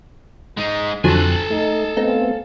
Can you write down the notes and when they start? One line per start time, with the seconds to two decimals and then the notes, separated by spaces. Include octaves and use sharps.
0.57 G#3 D#4
1.04 F2 D3 F3 F#3 C4 A4 G#5 F#6
1.50 A3 D#4
1.97 A3 B3 C4 D#4 C5 F5